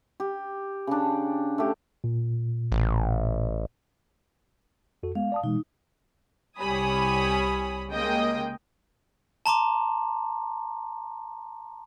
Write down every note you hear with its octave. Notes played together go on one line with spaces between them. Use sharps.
G4
C#3 D4
A3 G4
A#2
A1
F2 F#4 A4
G#3 B3 F5
D5 A5 D#6
B2 E3 G#3 D#4
C2 G3 C#5 G#5 B5 D#6
C#3 G#3 A#3 D#5 G5 D#6
A5 A#5 C6 D6